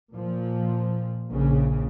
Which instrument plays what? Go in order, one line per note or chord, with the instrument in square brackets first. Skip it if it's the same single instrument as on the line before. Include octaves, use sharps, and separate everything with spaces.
[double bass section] A#2 F3
A#1 A#2 C#3